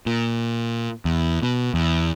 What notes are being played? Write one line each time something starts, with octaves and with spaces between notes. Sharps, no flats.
A#2
E2
B2
E2